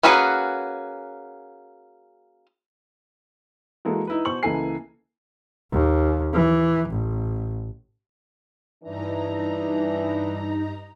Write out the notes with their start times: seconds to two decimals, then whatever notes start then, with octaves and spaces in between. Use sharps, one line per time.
0.03 A#3 C#4 F#4 G#4 B4
3.85 E3 G#3 A#3 F#4 A4
4.07 D#4 E4 B4
4.25 B2 C5 C#6 F#7
4.43 C#2 E3 A#3 A4 G#5 C7
5.72 D#2
6.34 E3
6.89 A1
8.84 G2 E3 D4 D#4 A#5